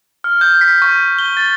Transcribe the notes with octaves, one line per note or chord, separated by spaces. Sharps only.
F6
G6
B6
C#6
G7
A6